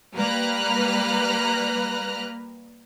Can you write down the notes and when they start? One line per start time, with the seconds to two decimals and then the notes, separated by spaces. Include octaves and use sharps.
0.14 G3 A#3 B4 A#5 F6 F#6